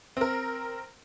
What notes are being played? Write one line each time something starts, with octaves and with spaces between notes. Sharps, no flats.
C4 A#4